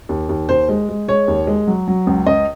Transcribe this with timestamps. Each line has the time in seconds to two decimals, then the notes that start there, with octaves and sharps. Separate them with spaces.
0.09 D#2
0.29 D#2
0.49 D#2 C5
0.69 G#3
0.89 G#3
1.08 G#3 C#5
1.28 D#2
1.47 G#3
1.67 F#3
1.88 F#3
2.07 C#2
2.27 C#2 D#5